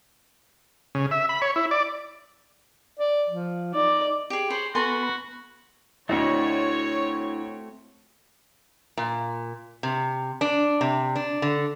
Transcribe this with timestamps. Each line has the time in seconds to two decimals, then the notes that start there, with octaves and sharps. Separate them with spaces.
0.95 C#3
1.11 E5
1.29 B5
1.42 C#5
1.56 E4
1.71 D5
2.99 D5
3.30 F3
3.74 D#4 D5
4.30 G4 G#4
4.50 G#4 C5 C#5 B5
4.75 B3 F#4 A4 G#5 B5 C6
6.09 D2 A3 C4 D4 E4 F#4 C#5 D#5
8.97 A#2
9.83 C3
10.41 D4
10.81 C3
11.16 D4
11.42 D3